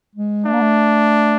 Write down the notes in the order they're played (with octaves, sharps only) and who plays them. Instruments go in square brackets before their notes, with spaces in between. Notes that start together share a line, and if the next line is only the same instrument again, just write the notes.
[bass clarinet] G#3
[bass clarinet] A3 [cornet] D4
[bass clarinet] A#3
A3